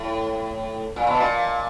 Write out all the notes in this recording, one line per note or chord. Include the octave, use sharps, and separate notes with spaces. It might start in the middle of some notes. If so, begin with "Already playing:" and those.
Already playing: A2
A#2
B2
A#2